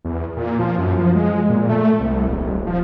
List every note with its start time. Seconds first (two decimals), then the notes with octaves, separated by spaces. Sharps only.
0.05 E2
0.37 A#2
0.59 F3
0.78 F#2
0.98 F3
1.15 G#3
1.50 A#2
1.69 A3
2.00 C2
2.28 D#1
2.67 F3